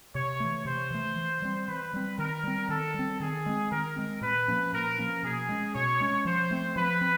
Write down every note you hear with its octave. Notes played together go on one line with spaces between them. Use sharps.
C3 C#5
E3 A3
C3 C5
E3 A3
E3
G3 C4
E3 B4
G3 C4
D#3 A#4
G3 C4
D#3 A4
G3
C4
D#3 G#4
G#3 C4
D#3 A#4
G#3 C4
A#2 B4
F3 A#3 C#4
A#2 A#4
F3 A#3 C#4
B2 G#4
G#3 C#4
B2 C#5
G#3 C#4
F3 C5
A3 C4
F3 B4
C4